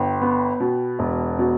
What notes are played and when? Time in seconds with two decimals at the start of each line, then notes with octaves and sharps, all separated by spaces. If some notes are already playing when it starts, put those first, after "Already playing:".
Already playing: G1 G5
0.22 B3
0.60 B2
0.99 E1
1.39 B2